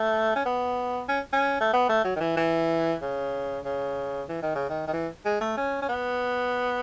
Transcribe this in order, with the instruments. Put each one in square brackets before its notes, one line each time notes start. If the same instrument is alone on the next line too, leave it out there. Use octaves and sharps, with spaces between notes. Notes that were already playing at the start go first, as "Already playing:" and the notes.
Already playing: [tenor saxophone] A3
C#4
B3
C#4
C#4
A3
B3
A3
F#3
D#3
E3
E3
C#3
C#3
E3
D#3
C#3
D#3
D#3
E3
G#3
A3
C#4
C#4
B3